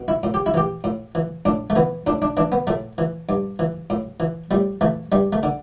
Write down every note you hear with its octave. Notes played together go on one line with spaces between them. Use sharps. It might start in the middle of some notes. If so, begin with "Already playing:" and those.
Already playing: B2
E4
A2
G4
E4
E3 G4
A2
E3
A2 D4
A3
E3 B3
A2 D4
D4
E3 D4
B3
A2 A3
E3
G2
E3
A2
E3
A2 G3
E3 A3
G2 G3
A3
D3